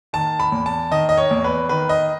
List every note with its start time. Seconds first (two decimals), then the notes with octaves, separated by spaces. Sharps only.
0.13 D#3 A5
0.39 B5
0.52 E2
0.66 A5
0.91 D#3 D#5
1.09 D#5
1.17 C#5
1.31 E2
1.44 B4
1.69 D#3 B4
1.89 D#5